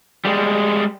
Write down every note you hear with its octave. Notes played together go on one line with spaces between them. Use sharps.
G3 G#3